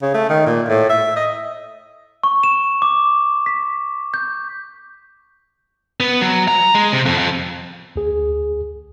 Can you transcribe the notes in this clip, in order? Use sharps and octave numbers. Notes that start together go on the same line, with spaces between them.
C#3
A3
D#3
A#2
A2
E5
D#5
C#6
E7
D6
B6
G6
B3
F#3
A#5
G#3
C3
F2
F2
D2 G#4